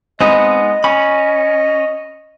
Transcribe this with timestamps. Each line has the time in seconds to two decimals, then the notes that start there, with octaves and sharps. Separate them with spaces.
0.21 G#3 B3 C4 D#4 D#5
0.84 C#4 B5